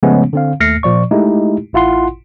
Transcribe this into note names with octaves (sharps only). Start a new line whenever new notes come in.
C#3 F3 G#3 A3 B3 C#4
D3 C4 F5
D#2 A3 F6 A#6 C7 C#7
A#2 F3 D5 C#6
G#3 A3 D#4 E4 G4
A1 E4 F4 F#5 C6